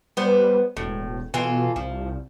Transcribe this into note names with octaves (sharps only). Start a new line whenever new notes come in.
G3 B3 B4 C5
E1 A2
B2 E3 F4 A4
C2 F3